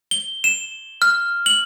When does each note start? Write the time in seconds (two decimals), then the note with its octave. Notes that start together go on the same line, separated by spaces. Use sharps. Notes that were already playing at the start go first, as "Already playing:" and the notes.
0.11 G7
0.44 E7
1.02 F6
1.46 F#7